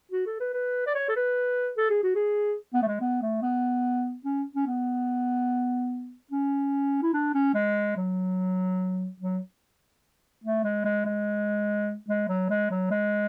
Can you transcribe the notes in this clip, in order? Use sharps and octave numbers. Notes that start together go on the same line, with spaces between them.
F#4
A4
B4
B4
D5
C#5
A4
B4
A4
G#4
F#4
G#4
B3
A3
G#3
B3
A3
B3
C#4
C#4
B3
C#4
E4
D4
C#4
G#3
F#3
F#3
A3
G#3
G#3
G#3
G#3
F#3
G#3
F#3
G#3